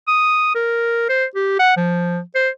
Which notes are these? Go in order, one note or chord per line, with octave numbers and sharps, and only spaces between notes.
D#6
A#4
C5
G4
F#5
F3
C5